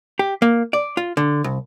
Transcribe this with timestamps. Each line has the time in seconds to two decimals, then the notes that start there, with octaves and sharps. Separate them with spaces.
0.19 G4
0.42 A#3
0.73 D5
0.97 F4
1.17 D3
1.44 C2